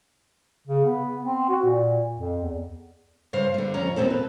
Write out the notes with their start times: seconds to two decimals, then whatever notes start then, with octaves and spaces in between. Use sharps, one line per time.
0.67 C#3
0.85 B3
1.23 C4
1.49 F#4
1.64 A#2
2.18 F2
2.41 E2
3.33 G2 C#3 C5 F5
3.54 D3 G3
3.74 F2 C#4 C#5 A#5
3.96 D#2 B2 C4 A4
4.10 B4